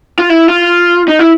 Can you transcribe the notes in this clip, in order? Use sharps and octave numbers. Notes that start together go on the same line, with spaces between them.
F4
E4
F4
D#4
E4